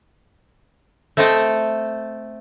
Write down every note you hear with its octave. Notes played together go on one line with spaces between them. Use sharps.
A3 C4 A4 D#5 G5